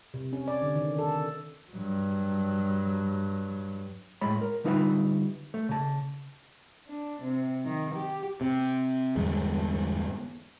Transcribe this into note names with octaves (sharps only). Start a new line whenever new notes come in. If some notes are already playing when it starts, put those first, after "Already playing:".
C3
C#4
D5
D3
D#3
A4
G2 F#3
A2 G#3 C#5 B5
A#4
D3 G3 D#4 F4 B4 E5
A3
C#3 A5
D4
C3
D#3
G4
C3
G1 E2 G#2 G#3